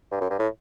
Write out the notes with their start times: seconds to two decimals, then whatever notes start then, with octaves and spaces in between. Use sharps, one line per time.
0.12 G2
0.21 F#2
0.30 G2
0.39 A2